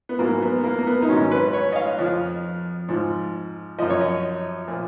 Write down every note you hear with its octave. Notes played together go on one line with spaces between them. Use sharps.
B3
G#2 F#3 A#3
B3
A#3
A#3
B3
D#4
G#2 D#3 F#3 C#4
B4
C#5
D#5
F5
F2 F3
G#2 F3
F#2 F3 D#5
C#5
D#5
A#2 F3